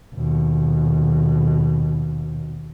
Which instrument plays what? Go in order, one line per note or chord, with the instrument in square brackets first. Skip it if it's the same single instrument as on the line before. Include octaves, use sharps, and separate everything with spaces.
[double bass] D#2 B2